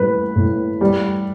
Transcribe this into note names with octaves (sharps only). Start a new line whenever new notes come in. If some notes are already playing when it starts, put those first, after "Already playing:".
Already playing: A2 G3 B4
A2
G3